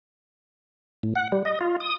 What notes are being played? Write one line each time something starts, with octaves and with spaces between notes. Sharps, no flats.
A2
F#5
G3
D#5
F4
D#6